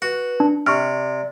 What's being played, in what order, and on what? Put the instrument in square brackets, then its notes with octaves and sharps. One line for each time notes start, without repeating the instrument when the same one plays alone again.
[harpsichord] F#4 [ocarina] B4
[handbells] D4
[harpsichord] C3 [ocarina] D5 [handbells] C#6 F6